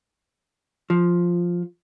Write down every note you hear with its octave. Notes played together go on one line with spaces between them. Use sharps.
F3